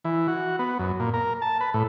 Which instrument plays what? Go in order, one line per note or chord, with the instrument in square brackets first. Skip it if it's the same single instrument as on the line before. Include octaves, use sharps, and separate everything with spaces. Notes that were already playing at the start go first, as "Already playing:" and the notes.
[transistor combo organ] E3
F#4
B3
F#2
A#2
A#4
A5
B4
A2